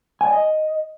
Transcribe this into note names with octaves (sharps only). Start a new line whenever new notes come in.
G#5
D5
D#5